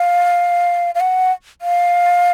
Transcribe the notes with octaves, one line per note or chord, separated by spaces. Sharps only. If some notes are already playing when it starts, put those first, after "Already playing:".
Already playing: F5
F5
F#5
F5